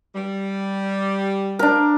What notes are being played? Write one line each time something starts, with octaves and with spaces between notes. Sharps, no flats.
G3
D4 A#4